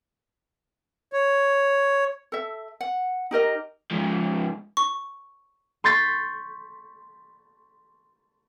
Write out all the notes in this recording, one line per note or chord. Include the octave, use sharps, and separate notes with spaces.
C#5
A4 E5
F#5
D#4 G4 A#4 D#5
G#2 F3
C#6
C6 C#6 G6 A6 B6